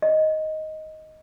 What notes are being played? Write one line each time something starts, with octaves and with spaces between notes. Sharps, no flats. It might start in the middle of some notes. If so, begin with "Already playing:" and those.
D#5